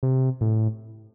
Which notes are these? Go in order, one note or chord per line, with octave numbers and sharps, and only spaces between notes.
C3
A2